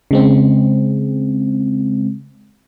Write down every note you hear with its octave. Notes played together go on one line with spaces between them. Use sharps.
C#3 G#3 C4